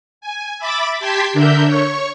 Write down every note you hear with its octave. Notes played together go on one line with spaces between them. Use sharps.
G#5
E5 B5 D6 A6
G4 G5 A5 C6 G#6 B6
D3 D4 A#4 E5 G6
C#5 C#6